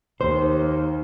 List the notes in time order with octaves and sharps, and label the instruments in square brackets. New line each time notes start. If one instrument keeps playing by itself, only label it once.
[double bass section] D#2 [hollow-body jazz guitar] C5